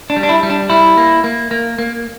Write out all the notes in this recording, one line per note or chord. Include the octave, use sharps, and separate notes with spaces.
D4
G3
D4
E4
G3
D4
G3 E4
A#3
A#3
A#3
A#3